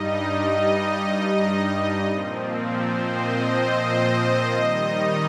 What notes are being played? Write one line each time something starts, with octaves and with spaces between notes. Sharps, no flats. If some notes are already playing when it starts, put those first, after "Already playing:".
Already playing: G2 G3 D#4 D#5
D#5
A#2 F3 C4
C5
D#5
C5
D#5
D#3 G3 D#4